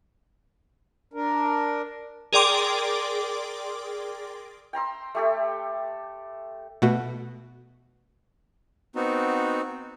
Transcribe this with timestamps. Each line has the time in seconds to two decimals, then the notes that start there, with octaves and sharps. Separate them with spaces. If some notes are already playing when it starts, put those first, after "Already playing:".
1.13 D4 A#4
2.33 G#4 A#4 D5 G5 C6 D6
4.73 G5 A#5 C6 E6
5.15 A3 G4 A4
6.82 B2 A3 F#4
8.95 B3 C4 D#4 F#4